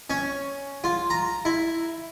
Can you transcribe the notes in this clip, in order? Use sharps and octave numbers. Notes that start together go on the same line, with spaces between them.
C#4
F4
A#5
E4